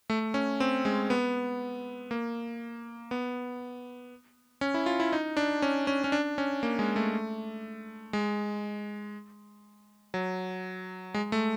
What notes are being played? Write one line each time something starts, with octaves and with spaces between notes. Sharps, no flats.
A3
C#4
C4
G#3
B3
A#3
B3
C#4
E4
F4
E4
D#4
D4
C#4
C#4
C#4
D4
C#4
A#3
G#3
A3
G#3
F#3
G#3
A3